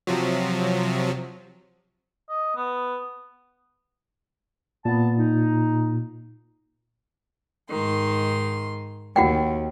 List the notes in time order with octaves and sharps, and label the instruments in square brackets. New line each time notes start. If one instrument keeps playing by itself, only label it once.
[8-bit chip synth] C3 F3 F#3
[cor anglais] D#5
B3
[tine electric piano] A#2 [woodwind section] B3 A5
[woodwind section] D#4
[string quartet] G#2 D#3 C6
[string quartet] D#2 [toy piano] F#4 F#5 G5